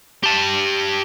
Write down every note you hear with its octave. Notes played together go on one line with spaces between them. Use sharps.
G4 A5